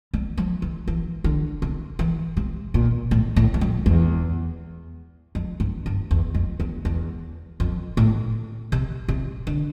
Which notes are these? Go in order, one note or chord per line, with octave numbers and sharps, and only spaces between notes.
G3
F3
E3
E3
D3
C3
E3
C3
A#2
A2
A2
E2
F2
E2
F2
G2
G2
E2
F2
E2
E2
F2
A2
C3
C3
D3